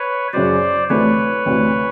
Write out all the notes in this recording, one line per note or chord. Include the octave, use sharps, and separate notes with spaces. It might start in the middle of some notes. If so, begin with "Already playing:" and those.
Already playing: B4 C#5
F#2 C#3 F#3 C5 D5
D2 C3 E3 A3 D4 B4 C#5
D2 C3 E3 A3 D4